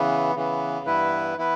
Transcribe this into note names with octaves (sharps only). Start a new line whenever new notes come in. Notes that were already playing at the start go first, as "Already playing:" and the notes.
Already playing: C#3 E3 B3
C#3 E3 B3
G2 E3 B3 E4 B4
E3 B3 E4 B4